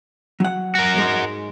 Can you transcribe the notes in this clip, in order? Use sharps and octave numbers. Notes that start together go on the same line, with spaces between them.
F#3 F#5
F#4 A#4
G#2 G#3